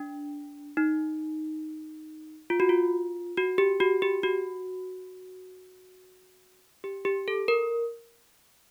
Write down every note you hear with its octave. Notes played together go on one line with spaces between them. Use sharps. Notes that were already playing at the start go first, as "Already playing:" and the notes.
Already playing: D4
D#4
F4
F#4
F4
F#4
G4
F#4
G4
F#4
G4
G4
A4
A#4